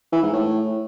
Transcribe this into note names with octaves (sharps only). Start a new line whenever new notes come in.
E3
G#2
A2